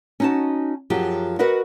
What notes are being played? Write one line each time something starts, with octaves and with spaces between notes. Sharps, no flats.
C#4 D#4 F#4 D#5 A5
F#2 F3 F#3 G4 G#4
F#4 A#4 B4 D#5 F#5